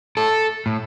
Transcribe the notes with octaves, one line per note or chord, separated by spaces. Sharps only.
A2 A4
A2